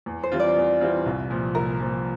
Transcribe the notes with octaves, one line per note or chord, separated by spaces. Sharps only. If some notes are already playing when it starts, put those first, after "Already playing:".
E2
C5
E3 G3 C4 F4
D5
E2
E3 G3 C4 F4
C2
A#2 F3
C2 A#4
A#2 F3